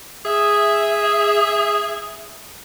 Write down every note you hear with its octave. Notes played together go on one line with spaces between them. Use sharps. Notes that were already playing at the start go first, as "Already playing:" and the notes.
G#4 E5